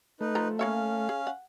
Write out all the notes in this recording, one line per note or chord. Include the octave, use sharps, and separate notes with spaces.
A3 D#4 B4
F3 A#5
A#3 C#4 C#5 E5 F5
G#4
F#5